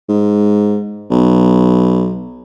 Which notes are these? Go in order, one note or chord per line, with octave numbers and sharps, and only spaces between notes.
G#2
B1